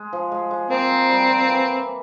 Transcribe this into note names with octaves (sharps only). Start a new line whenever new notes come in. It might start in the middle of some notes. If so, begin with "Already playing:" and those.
Already playing: G#3
F3
G#3
G#3
A#3 C4
G#3
G3
F3
E3